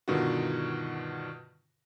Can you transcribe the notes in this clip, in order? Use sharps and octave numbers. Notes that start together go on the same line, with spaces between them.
G2 B2 D3 D#3 F4 F#4